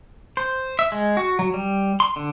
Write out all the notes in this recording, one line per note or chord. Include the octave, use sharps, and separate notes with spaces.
C5
E5
G#3
F#4
F#3
G3
C6
D3